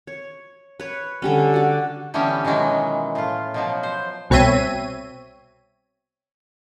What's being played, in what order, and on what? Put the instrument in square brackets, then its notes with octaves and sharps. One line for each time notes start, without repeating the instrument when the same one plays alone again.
[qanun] C#5
B4 C#5
D3 G3 C#4
F#4 D5
[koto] D3 E3 G3 B3 C#4
B2 D#3 E3 F#3 G#3
A2 F4
B2 F3 F#3
C5
[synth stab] C2 B2 C4 C#5 E5 D#7